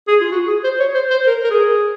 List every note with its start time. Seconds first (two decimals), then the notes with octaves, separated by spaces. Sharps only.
0.08 G#4
0.21 F4
0.32 F#4
0.48 G#4
0.64 C5
0.79 C#5
0.95 C5
1.11 C5
1.27 A#4
1.44 A#4
1.51 G#4